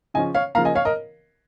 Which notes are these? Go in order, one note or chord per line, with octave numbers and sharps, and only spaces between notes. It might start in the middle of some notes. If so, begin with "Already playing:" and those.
C#3 F3 C#4 D#5 G#5
C#5 F5
C#3 F3 A#3 F5 A#5
D#5 G#5
C#5 F5
A#4 D#5